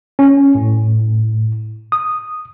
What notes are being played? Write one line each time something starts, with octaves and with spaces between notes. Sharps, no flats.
C#4
A2
D#6